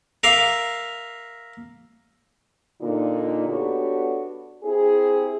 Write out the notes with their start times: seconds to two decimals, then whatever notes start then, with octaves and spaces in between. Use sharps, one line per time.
0.23 A#4 E5 F5 D6
2.81 A#2 D3 D#4
3.47 B3 D4 F#4 G4 A4 C#5
4.64 C4 E4 G4 G#4